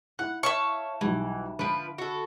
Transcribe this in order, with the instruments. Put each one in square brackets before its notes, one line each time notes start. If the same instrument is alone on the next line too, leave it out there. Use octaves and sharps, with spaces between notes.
[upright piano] E4 F#6 [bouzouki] F#5
[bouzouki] C#5 F5 [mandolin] E5 A5 C#6
[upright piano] B1 G3 [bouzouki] E3
[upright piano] D3 B5 D7 [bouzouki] F3 B4
[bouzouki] F#4 A4